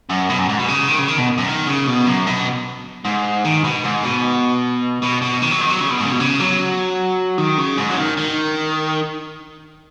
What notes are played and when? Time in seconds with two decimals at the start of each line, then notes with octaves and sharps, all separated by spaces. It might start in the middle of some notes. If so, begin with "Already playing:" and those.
0.10 F#2
0.30 B2
0.39 F#2
0.49 G#2
0.59 B2
0.69 C#3
0.88 D#3
0.99 C#3
1.08 D#3
1.18 B2
1.38 F#2
1.48 D#3
1.67 C#3
1.87 B2
2.06 F#2
2.26 B2
3.05 G#2
3.45 D#3
3.64 B2
3.84 G#2
4.04 B2
5.02 B2
5.22 B2
5.42 D#3
5.51 F#3
5.61 D#3
5.70 F#3
5.81 C#3
5.90 B2
6.01 G#2 C#3
6.11 B2
6.20 C#3
6.40 F#3
7.38 D#3
7.58 C#3
7.78 G#2
7.90 F#3
7.97 D#3
8.17 D#3